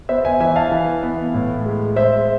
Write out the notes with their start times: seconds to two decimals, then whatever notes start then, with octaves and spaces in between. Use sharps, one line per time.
0.09 B3 C5 E5
0.25 E5 G#5
0.40 E3 E5 G#5
0.56 F5 A5
0.72 E3
1.03 B3
1.34 A2
1.66 G#3
1.96 G#3 C5 E5